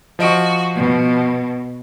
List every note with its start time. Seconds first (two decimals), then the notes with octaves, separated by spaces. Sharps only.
0.19 F3 F#4 D#5 D7
0.75 B2